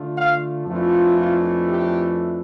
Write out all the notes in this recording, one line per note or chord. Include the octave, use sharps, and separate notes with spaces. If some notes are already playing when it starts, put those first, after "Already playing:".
Already playing: D3 A3 D4 F4
F5
F2 E3 A3 D4 F4
F4
G4